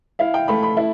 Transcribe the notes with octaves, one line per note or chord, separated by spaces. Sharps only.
E4 F5
G5
A3 B5
B5
E4